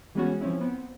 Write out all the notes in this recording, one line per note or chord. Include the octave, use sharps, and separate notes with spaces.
E3 G3 G#3 B3 C#4 F#4
F3 C4 C#4 E4
B3 C4